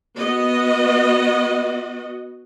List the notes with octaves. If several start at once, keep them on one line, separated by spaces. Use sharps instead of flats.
B3 F#4 D#5